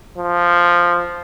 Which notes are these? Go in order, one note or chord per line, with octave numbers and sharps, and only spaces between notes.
F3